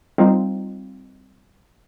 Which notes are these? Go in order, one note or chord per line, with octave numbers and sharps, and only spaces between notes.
G3 C4 D#4 F4